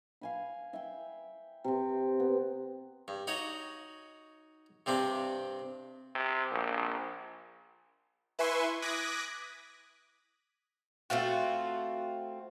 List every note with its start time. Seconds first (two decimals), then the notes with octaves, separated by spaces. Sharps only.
0.21 F5 G#5 B5
0.73 E5 G5
1.64 C3 C4
2.20 B3
3.08 G2
3.27 D#4 F#4 C#5
4.86 G2 C3 C4 D4
6.15 C3
6.51 A#1
8.39 E4 B4 E5 G#5 C6 C#6
8.82 D6 D#6 F#6 G#6 A#6 B6
11.10 A3 C4 F4 F#4